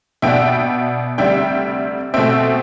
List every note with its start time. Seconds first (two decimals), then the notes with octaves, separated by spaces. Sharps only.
0.22 B2 B3 D4 E5 G5
1.18 D2 C3 G3 D4 E5 G5
2.14 B2 A3 C4 E5 G5